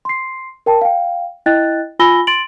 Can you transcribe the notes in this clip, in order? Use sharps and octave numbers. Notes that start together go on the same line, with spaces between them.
C6 C7
A#4 G5 A5
F5 G5
E4 D#5 G5 F#6 A6
F4 G#5 B5 E6 A#6 G7
C6 A6 D7 F#7